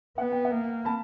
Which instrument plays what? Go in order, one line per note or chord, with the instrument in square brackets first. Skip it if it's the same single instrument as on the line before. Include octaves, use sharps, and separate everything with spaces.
[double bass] B3 [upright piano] F#5
[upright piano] G5
E5 F#5
[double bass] A#3
[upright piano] A5 B5